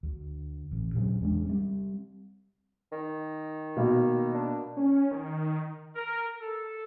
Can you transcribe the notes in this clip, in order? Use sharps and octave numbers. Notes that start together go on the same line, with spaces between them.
D2
A1
A#2 C#3 F#3 C4
E2 G#3 D4
G3 C4
D#3
B2 A#3
D4
C#4
D#3
A#4
A4